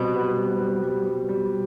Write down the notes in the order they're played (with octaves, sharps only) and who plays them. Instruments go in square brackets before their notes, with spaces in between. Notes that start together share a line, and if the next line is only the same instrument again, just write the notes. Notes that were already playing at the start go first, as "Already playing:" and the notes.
Already playing: [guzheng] B2 B3 [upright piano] G3 C4
[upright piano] G3
G3
G3
G3
G3
G3